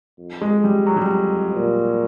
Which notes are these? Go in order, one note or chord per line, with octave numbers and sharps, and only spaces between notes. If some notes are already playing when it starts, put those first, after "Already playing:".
F2
G#3
G3
F2 F#3
G3
F#3
A#2